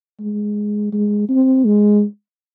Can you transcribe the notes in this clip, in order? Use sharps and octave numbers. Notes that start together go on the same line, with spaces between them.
G#3
G#3
C4
G#3